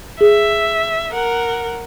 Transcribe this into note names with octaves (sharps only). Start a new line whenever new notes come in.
G#4 E5
A#4 F#5